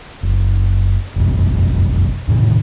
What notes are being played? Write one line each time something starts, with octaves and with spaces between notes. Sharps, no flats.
F#1
F#1 B1 F2
E2 A2 C3 D#3